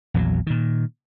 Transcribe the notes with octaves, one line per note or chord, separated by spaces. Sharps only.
A#1 E2 E3 F#3
A#2 D#3